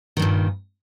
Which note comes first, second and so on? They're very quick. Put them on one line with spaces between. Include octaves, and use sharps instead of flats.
D#3 G2 A#2